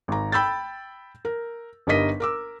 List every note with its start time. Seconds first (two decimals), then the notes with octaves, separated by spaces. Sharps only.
0.08 G#1 A#5
0.32 G5 B5 E6 G6 A6
1.25 A#4
1.87 G1 G2 D#4 A#4 D#5 B6
2.20 A#4 D6 E6